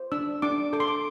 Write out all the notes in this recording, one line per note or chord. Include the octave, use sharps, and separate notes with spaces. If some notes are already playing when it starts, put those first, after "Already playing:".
Already playing: C5
D4 E6
D4 D6
A4 D6
C6
D6